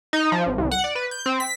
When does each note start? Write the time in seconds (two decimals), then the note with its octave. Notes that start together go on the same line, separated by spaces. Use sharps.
0.13 D#4
0.32 F3
0.46 G#1
0.58 C2
0.71 F#5
0.84 D5
0.95 B4
1.11 G6
1.26 C4
1.40 B6